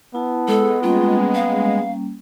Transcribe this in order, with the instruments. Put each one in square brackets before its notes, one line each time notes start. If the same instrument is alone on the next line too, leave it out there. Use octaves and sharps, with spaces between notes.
[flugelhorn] B3 [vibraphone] E4 A5
[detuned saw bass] G#3 [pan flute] A4
[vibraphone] G3 A#3 C#4 [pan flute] F4
[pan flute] F5